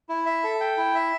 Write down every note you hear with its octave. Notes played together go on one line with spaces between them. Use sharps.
E4
E5
A4
G5
E4
E5